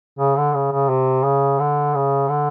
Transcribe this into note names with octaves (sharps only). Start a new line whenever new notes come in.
C#3
D3
C#3
C#3
C3
C#3
D3
C#3
D3